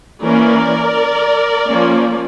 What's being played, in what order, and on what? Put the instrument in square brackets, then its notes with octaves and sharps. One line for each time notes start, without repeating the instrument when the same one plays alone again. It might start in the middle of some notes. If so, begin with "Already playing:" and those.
[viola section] E3 A#3 C#4 A#4 D5
F3 A#3 C#4